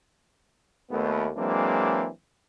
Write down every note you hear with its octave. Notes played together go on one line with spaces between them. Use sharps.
D#2 A3 B3
E3 F#3 G#3 A#3 C4 D4